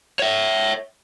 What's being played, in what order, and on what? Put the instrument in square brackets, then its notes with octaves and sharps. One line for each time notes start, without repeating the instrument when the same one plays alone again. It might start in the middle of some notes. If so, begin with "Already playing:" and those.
[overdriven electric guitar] C#5 E5